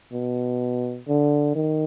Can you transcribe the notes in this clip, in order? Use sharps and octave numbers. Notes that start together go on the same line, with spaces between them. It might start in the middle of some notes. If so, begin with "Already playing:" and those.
B2
D3
D#3